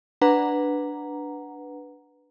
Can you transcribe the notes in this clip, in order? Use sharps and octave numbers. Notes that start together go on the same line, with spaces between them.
D4 B4 F#5 A#5